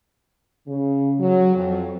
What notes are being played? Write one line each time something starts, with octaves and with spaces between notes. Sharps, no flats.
C#3
F#3
F2